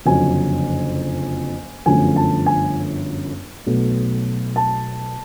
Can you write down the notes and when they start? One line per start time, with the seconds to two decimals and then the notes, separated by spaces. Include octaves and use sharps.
0.06 F#1 F2 D3 F#3 G#5
1.86 G1 F#2 D3 F3 A3 G#5
2.16 A5
2.46 G#5
3.66 B1 B2 F#3 A3
4.56 A5